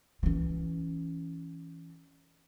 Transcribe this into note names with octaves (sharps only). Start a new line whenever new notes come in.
E3 C#4